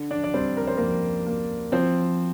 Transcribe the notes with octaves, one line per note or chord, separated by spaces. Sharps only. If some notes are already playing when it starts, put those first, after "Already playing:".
Already playing: D3
D4 D5
D5
G3 C4 C5
A#4
C5
F2 A#3 A#4
A#3
F3 C4 C5